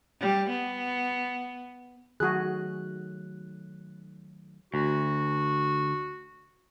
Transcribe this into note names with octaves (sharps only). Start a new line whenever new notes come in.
G3
B3
D#3 F#3 A3 F#4 G#4 F#6
D2 F#4